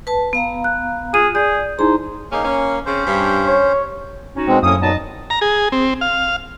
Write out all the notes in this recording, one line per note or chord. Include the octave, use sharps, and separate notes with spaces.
B4 A5
B3 F5 A#5
F#6
F4 G#4 D#7
G#4 D5 G6
D#4 E4 G#4 C5 A#5
C#3 A#3 C#4 D#4
C#4
C#3 C4 C#4 C5
G2
C#5
C#4 D#4 F#4
B2 G#3 C4
F#2 A2 A#3 C#4 D#6
A#2 F#3 B3 D#4 D#5 A5
A#5
G#4
C4
F5